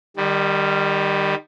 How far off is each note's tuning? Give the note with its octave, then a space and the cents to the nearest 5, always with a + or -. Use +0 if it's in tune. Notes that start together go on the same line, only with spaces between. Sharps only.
D#3 -25 G3 +10